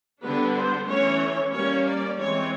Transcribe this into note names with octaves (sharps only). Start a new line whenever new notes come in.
D3 G3 B3 D4 B4
C5
E3 A3 C#4 C#5
G3 A#3 C#4 C#5
D5
E3 G#3 C4 C#5